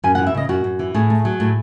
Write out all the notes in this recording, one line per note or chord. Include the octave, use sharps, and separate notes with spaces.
F#2 G#5
E3 F#5
E5
C#3 D#5
F#2 F#4
F#2
E3
A2 G#4
A3
F#3
A2